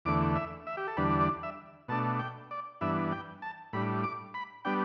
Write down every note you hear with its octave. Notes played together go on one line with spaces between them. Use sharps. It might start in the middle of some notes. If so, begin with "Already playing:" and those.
E2 D3 A3 D6
E5
E5
G4
A4
E2 D3 G3 D4 B4
D5
E5
B2 A3 D4 A5
G5
D5
G2 E3 B3 D4 E5
G5
A5
A2 G3 D4 B5
D6
B5
G3 B3 D4 G5